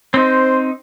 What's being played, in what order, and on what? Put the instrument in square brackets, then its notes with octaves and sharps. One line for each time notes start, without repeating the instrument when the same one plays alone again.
[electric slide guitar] C4 D#4 [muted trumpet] C5